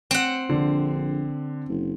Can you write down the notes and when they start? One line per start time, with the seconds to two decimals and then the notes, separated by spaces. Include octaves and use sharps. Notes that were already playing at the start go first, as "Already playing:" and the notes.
0.11 C4 F#5
0.50 A#1 D3
1.69 F#1